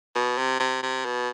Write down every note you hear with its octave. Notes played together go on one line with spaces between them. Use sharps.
B2
C3
C3
C3
B2